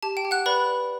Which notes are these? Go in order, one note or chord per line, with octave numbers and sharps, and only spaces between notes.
G4 A5
G5
G4
F#5 F#6
B4 D5 B5